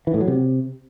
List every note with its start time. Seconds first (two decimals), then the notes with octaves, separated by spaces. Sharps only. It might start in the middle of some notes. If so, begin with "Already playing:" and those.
0.07 E3
0.14 A2
0.21 F#3
0.28 C3